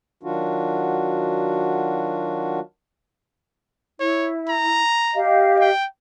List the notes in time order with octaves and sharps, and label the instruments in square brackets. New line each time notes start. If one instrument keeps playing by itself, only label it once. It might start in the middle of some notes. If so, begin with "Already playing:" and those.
[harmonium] D#3 F#3 D4 F4 F#4
[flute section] E4 [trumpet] C#5
[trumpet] A#5
[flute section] G4 D#5 F5
[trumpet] G5